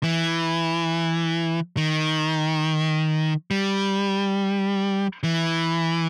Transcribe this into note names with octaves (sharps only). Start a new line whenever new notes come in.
E3
D#3
G3
E3